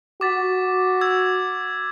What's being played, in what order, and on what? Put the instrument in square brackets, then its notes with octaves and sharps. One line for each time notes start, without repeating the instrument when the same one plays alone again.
[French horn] F#4 [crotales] D6 A6 B6
[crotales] E6 G#6